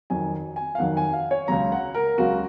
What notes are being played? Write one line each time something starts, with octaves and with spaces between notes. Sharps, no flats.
F2 D#3 F#3 G#5
G#5
F5
F2 D#3 F#3 F#5
G#5
F5
C#5
C#2 C#3 F#3 A#5
F#5
A#4
C#2 C#3 F#3 F#4